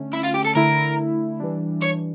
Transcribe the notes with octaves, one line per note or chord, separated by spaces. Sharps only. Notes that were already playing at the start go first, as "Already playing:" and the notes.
Already playing: D3 A3 C#4
E4
F4
G4
A4
D3 A3 E4 A#4
E3 G3 D4
C#5